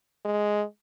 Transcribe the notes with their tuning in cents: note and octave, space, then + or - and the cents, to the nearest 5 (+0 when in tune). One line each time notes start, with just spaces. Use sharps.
G#3 +5